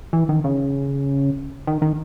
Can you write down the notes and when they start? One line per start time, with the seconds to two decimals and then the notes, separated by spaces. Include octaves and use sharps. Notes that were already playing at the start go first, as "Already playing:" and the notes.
0.13 E3
0.29 D#3
0.44 C#3
1.67 D#3
1.82 D#3